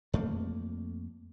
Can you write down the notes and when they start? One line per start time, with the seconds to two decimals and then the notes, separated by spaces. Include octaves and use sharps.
0.14 F2 A3 A#3